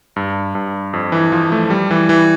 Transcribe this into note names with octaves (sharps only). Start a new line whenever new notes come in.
G2
G2
F2
E3
F3
A3
G3
E3
E3